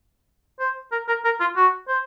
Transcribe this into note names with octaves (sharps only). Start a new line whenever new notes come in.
C5
A#4
A#4
A#4
F4
F#4
C5